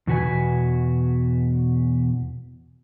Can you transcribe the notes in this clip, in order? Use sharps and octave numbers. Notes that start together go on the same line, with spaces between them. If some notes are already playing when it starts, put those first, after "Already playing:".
E2 B2 F#4 B4 G#5